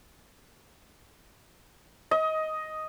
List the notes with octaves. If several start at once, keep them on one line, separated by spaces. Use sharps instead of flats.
D#5